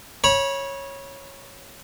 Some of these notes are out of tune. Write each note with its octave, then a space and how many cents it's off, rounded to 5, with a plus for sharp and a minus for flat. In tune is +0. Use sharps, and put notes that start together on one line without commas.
C#5 -10 B5 -30